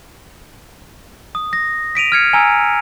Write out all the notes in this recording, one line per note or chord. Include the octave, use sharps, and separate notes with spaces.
D#6
A#6
B6 D7 D#7 F7
F6 G#6 C#7
G#5 A#5 E6 G#6